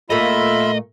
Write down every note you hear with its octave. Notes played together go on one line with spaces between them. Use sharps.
A#2 A3 A#3 F4 D#5 E5 B5